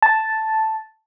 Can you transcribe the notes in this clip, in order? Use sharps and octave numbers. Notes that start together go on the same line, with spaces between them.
A5